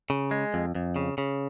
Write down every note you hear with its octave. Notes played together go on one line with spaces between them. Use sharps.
C#3
G#3
F2
F2
C#3
C#3